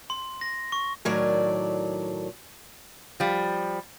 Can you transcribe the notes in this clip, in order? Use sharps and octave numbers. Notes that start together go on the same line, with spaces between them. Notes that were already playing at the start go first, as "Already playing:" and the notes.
C6
A#6
C#6
A2 D#3 F#3 A#4 D5
F3 G3